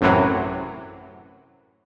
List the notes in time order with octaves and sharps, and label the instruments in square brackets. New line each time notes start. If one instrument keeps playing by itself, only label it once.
[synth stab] A1 F#2 A2 C3 E3 F#3